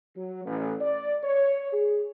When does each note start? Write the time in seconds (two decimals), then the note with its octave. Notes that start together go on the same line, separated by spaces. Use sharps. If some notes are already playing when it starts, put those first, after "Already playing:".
0.17 F#3
0.46 A1
0.81 D5
1.23 C#5
1.73 G#4